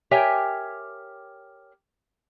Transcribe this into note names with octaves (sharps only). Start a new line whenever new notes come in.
G4 A#4 C#5 E5 G5 G#5